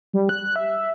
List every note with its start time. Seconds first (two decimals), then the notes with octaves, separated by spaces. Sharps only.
0.13 G3
0.29 F#6
0.44 F#6
0.56 E5